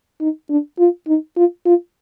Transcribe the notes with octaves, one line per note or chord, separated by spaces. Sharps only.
D#4
D4
F4
D#4
F4
F4